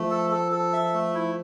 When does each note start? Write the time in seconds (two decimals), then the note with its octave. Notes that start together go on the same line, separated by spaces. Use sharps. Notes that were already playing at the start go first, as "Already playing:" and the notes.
Already playing: F3 A3
0.11 A4
0.31 A4
0.52 A4
0.73 E5
0.94 A3
1.14 E4